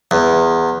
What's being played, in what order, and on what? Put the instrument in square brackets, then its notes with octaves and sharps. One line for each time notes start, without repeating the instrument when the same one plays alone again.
[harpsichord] E2